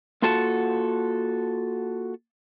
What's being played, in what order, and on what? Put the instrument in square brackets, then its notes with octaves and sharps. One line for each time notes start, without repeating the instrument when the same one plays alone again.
[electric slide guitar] A#3 F4 F#4 A4 F#5 A5